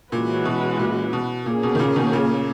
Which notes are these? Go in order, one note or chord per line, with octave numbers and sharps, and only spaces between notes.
A#2 E3 G#3 C#4 F#4 B4
B2
A#2
B2
A#2 A#3 C#4 G#4
B2
D#3
A#2 C#3
B2 D#3
A#2 C#3